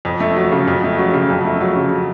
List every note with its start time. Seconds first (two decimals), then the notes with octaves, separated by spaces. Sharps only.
0.05 F2
0.20 A3
0.36 F#3
0.52 C#3
0.68 F2
0.84 A3
0.98 F#3
1.14 C#3
1.30 F2
1.45 A3
1.61 F#3
1.76 C#3